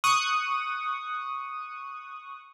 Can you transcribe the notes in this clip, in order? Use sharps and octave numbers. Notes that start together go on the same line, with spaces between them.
C#6 D#6 F#6